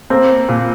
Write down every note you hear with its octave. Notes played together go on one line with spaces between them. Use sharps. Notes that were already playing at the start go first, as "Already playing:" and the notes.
A#3 C4
A#2